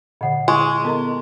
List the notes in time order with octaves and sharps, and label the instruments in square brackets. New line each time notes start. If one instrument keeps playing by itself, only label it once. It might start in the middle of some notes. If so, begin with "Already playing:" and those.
[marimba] A#2 D3 [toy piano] D#5 F#5
[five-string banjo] G#3 [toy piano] E4 C#6
[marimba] B3 A#4 A#5 [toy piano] A4 D#5